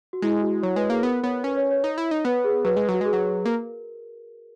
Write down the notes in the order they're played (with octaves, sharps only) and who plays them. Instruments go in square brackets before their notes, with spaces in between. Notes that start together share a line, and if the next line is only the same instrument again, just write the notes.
[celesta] F#4
[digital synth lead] G#3 [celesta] E4
[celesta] F#4
[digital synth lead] F#3 [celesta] C#5
[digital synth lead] G#3 [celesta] B4
[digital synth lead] A#3 [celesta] G#4
[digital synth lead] B3 [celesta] A#4
[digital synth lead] B3 [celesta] C#5
[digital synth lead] C#4 [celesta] B4
[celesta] C#5
C#5
[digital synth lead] D#4
E4
D#4
[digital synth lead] B3 [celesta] B4
[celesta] G#4
[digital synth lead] F#3 [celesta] B4
[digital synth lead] G#3
F#3
[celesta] F#4
[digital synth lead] G#3 [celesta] G#4
[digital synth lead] F#3
[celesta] F#4
[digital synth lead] A#3 [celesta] A#4